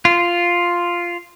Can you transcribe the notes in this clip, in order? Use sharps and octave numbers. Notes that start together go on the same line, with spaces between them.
F4